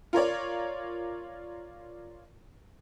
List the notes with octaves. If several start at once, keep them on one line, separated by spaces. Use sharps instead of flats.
F4 A#4 C#5 D5